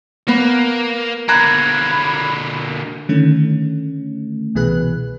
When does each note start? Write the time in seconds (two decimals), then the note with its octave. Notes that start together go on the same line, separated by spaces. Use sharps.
0.28 A#3 B3
1.29 D3 A#3 A#5 B5 F#6 G#6
3.09 D3 D#3 A3 C#4
4.55 C2 B2 E3 G#4 B4 F#6